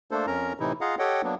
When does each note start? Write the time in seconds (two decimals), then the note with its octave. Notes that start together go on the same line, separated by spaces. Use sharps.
0.11 A3 A#3 D4 A4 C5
0.27 F2 C#4 A#4 A#5
0.60 A2 C3 E3 D#4 E4
0.81 F4 G#4 D#5 F5 F#5 A#5
0.99 G4 A4 C#5 D#5 F#5 G5
1.24 F#3 A#3 B3 D4